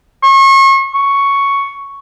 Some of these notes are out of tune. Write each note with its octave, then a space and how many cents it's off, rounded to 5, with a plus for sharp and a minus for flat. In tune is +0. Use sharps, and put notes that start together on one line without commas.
C#6 -35
C#6 +5